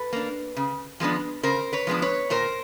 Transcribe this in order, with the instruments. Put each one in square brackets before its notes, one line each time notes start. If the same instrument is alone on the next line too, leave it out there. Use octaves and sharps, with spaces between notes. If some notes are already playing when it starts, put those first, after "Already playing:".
Already playing: [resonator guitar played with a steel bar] A4 B4
A#3 D4
C#3
F3 G#3 B3 D4
C#3 A#4 C5
B4 C#5
F3 G#3 B3 D4
B4 C#5
A#2 A#4 C5